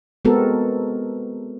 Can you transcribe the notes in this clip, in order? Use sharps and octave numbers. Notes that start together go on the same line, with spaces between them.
G#3 B3 C4 F#4 A4 A#4